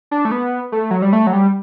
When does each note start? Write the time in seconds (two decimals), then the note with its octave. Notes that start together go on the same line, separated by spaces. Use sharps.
0.11 D4
0.25 A3
0.32 B3
0.72 A3
0.91 F#3
1.02 G3
1.13 A3
1.27 F#3
1.33 G3